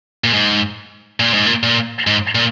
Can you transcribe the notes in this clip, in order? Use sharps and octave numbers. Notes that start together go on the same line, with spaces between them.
A#2
G#2
A#2
G#2
A#2
A#2
G#2
A#2